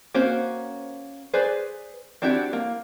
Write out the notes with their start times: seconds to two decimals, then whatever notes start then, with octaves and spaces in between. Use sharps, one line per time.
0.14 A#3 C#4 F#4 C5
1.34 G#4 B4 C5 D5
2.22 C4 D4 E4 F#4 G4
2.53 A#3